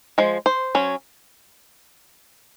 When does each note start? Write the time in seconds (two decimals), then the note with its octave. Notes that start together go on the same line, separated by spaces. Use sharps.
0.18 F3 G#3
0.46 C5
0.75 F#3 C#4